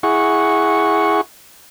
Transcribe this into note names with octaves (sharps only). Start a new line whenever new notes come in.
E4 G#4 F#5 C#6